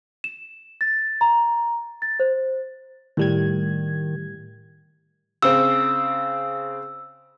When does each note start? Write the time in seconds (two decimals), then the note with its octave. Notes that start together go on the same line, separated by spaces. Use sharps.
0.24 E7
0.81 A6
1.21 A#5
2.02 A6
2.20 C5
3.17 A2 D#3 G3 G#6
5.42 C#3 C4 E6